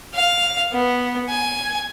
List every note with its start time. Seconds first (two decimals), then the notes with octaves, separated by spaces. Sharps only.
0.14 F5
0.73 B3
1.29 G#5